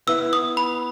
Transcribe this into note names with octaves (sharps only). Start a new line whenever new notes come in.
B3 E4 B4 E5 E6
D#6
B5